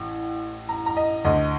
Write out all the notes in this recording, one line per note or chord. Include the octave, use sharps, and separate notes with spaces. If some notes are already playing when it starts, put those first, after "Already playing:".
Already playing: A1 A2
A#5
A#5
D#5
D2 D3 D#5